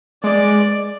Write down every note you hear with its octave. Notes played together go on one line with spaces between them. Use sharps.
G#3 D5